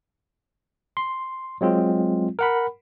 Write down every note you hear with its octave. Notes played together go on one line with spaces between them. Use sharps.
C6
F#3 G#3 C4 F4
A#4 F#5 B5